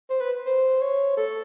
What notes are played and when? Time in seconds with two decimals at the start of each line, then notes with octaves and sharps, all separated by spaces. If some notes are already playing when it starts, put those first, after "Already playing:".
0.10 C5
0.21 B4
0.46 C5
0.81 C#5
1.17 A4